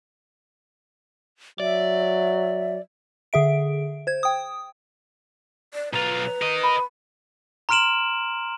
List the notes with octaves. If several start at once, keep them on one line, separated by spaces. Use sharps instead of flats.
F#3 D5 E5
D3 G#4 E5 D7
C5 G#6
G5 D#6
D5
B1 F4 B4 A#5 F7
A#4 D#5
B5
A#5 C6 F6 D7 E7 F#7